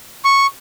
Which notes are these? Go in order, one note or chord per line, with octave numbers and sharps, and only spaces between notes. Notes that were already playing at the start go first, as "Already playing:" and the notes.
C#6